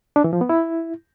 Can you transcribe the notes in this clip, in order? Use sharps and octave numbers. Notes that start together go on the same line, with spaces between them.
D4
E3
F3
B3
E4